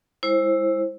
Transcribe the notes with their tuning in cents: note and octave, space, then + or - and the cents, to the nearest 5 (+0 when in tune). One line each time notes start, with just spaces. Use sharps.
G#3 -35 E4 +0 C5 +20